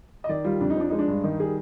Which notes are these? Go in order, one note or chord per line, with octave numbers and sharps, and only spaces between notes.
D#5
D#3 D5
G3 F4
F2 D4
D#4
F3 D4
G#3 D#4
D4
G2
D#3 D#4
G3 G#4